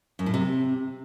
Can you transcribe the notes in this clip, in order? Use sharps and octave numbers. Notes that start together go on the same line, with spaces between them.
F#2
A2
C3